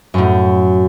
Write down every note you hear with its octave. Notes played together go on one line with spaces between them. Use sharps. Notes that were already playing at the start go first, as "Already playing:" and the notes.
F#2 A2